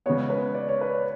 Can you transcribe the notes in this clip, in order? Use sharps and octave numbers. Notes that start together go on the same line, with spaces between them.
C#3 G#3 B3 C#5
B4
D5
C#5
B4
C#5